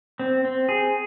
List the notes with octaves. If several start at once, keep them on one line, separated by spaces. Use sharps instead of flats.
C4
C4
G#4